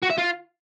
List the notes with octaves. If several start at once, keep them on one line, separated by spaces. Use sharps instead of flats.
F#4
E5
F4